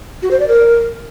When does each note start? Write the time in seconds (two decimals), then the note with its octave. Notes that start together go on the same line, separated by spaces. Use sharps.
0.22 F#4
0.31 C5
0.40 D5
0.48 A#4